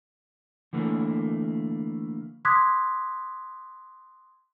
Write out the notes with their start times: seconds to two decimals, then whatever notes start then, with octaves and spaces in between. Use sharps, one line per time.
0.73 D3 E3 A3 A#3
2.45 C6 D6 D#6 F#6 G#6 B6